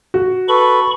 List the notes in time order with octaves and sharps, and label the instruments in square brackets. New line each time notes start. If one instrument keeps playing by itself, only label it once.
[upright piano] F#4
[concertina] A4 B4 [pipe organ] B5 C#6